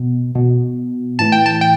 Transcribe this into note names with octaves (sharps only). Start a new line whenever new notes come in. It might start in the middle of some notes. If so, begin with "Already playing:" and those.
Already playing: B2
B2
A2 E3 A5
G5
A5
G5